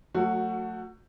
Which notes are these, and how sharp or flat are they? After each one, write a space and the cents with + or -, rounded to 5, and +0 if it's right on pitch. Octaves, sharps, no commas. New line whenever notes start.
F#3 -20 A3 +25 F#4 +0